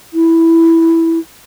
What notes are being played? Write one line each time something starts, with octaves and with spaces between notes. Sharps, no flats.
E4